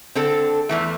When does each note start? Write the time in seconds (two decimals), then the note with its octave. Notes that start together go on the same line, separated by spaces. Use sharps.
0.15 D3 C4 A4
0.69 E2 E3 A3